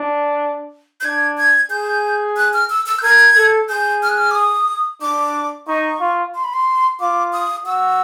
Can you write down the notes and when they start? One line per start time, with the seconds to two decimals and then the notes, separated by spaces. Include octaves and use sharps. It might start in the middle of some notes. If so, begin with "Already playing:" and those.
Already playing: D4
1.00 G6
1.04 D4 G#6
1.38 G#6
1.70 G#4 G6
2.37 F#6
2.53 F6
2.70 E6
2.86 E6
2.99 G6
3.03 A#4 G#6
3.36 A4
3.68 G#4 G6
4.03 F6
4.09 F#6
4.17 F6
4.31 D6
4.35 D#6
5.01 D4 D6
5.67 D#4 C#6
6.00 F4
6.34 C6
6.44 B5
6.53 C6
7.00 F4 D6
7.33 D#6
7.66 F#4 E6